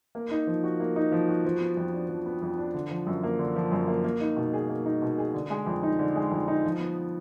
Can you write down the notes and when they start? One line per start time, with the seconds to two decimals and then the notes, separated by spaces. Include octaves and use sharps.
0.15 A#3
0.31 D#4
0.47 F3
0.64 F#4
0.80 A#3
0.96 D#4
1.12 F3
1.28 F#4
1.45 F3
1.61 B3
1.77 F2
1.93 D4
2.09 F3
2.26 B3
2.42 F2
2.58 D4
2.74 D3
2.91 F3
3.07 F#2
3.23 A#3
3.39 D3
3.56 F3
3.72 F#2
3.88 A#3
4.04 A#3
4.21 D#4
4.37 B2
4.53 G#4
4.69 A#3
4.86 D#4
5.02 B2
5.18 G#4
5.34 D3
5.50 G#3
5.67 F2
5.83 D#4
5.99 D3
6.16 G#3
6.32 F2
6.48 D#4
6.64 F3
6.80 B3